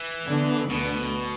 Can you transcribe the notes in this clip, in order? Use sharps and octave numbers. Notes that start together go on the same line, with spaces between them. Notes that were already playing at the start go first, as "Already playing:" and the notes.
Already playing: E3
D3 B3 D4
D2 B2 D3 B3